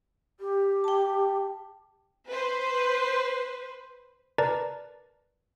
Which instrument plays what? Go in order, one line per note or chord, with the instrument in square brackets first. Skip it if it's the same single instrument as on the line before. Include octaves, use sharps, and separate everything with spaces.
[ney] G4
[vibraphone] G5 A5
[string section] B4 C5
[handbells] A#4 B4 D5 A5 A#5 A6